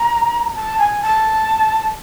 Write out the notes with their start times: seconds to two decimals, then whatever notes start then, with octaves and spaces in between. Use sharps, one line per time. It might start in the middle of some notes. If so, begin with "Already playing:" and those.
Already playing: A#5
0.55 A5
0.79 G#5
1.02 A5